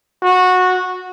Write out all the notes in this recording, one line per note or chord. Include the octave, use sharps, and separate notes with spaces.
F#4